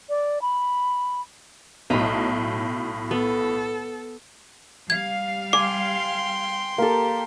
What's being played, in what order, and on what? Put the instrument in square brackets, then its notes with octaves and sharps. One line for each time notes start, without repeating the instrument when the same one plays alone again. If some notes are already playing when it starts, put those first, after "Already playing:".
[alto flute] D5
B5
[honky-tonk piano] B1 A2 [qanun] D#5 A#5 B5
[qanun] B3 [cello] A4
[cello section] G3 F5 [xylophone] G#6
[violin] G5 C6 [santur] G#5 [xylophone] D6
[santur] A#3 A4 [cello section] G4